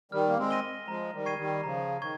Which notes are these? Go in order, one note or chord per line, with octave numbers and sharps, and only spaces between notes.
D#3 G3 F6
A#3
G#3 C4
A#6 D#7 G7
F3 G#3 A#5
D#3 G3
C#6 G#6 C7 D#7
D#3 G3
C#3 F3 A#5
D#3 C#6 G#6